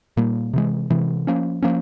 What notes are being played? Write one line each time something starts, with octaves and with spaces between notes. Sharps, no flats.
A#2 G3 A#3
C3 E3 G#3
C3 E3 G#3
F3 A#3 C#4
F3 A#3 C#4